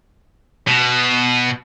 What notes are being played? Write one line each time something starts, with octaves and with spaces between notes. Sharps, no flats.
B2